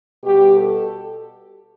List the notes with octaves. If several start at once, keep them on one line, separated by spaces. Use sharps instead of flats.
B2 G3 G4
A4